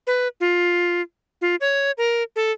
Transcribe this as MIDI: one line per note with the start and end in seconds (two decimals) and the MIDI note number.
0.07 0.28 71
0.40 1.01 65
1.41 1.56 65
1.61 1.91 73
1.98 2.23 70
2.36 2.52 69